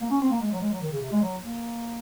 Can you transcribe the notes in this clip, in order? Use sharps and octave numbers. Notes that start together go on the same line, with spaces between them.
A#3
C#4
C4
A#3
G#3
F#3
G#3
F#3
D#3
C#3
C3
G#3
F#3
A#3